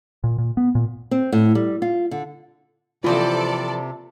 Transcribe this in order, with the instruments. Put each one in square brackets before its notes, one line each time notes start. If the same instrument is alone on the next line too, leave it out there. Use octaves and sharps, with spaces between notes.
[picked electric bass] A#2
A#2
B3
A#2
[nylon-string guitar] C4
A2
G3
F4
D3
[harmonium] C3 [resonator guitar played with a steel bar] E3 F3 C4 [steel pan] F4 [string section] A4 D5